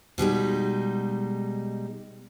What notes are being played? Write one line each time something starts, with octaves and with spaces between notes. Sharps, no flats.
B2 G3 G#3 D#4